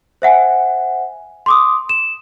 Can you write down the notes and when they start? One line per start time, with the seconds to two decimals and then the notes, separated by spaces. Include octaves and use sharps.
0.22 C5 E5 F#5 G#5
1.46 C6 D6 D#6
1.89 E7